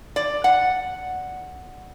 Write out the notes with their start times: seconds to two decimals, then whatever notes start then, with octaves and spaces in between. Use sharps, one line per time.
0.16 D5
0.44 F#5